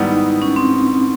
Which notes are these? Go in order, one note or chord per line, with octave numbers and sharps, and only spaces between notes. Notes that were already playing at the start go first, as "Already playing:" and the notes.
Already playing: G#2 D#3 G3 B3 E4
D#4
C#4
C4
C4